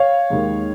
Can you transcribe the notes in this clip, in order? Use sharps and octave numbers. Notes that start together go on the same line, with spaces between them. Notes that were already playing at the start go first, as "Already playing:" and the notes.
Already playing: C#5 F5
D#2 D#3 G#3